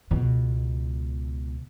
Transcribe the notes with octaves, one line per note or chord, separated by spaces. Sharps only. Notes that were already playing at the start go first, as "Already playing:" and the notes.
C#2 B2